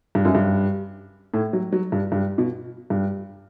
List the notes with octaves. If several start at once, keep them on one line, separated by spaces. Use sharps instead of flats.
G2
F#2
G2
A2
F#3
F#3
G2
G2
B2
G2